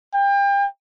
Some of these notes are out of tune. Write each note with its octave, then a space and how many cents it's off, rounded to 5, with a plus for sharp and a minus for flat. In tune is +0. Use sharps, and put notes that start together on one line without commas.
G5 +35